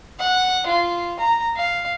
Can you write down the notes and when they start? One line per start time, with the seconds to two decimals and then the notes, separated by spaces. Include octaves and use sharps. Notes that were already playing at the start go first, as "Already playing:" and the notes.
0.20 F#5
0.67 F4
1.20 A#5
1.56 F5